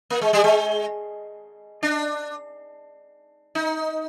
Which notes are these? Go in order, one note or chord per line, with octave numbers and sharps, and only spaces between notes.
A#3
G#3
G3
G#3
D4
D#4